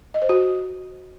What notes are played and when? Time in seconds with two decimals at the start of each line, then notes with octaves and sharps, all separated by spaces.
0.14 D#5
0.22 C5
0.29 F#4